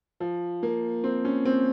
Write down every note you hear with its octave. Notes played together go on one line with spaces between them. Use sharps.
F3
A#3
C4
C#4
C4